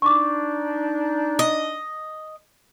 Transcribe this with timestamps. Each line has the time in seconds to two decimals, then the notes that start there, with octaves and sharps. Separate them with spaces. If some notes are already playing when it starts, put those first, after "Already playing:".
0.02 D4 D#4 C#6 D6
1.39 D#5